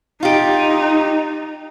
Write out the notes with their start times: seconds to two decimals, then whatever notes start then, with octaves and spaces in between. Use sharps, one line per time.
0.23 D#4 F4 G4